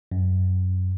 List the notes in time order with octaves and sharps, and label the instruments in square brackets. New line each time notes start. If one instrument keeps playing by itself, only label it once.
[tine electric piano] F#2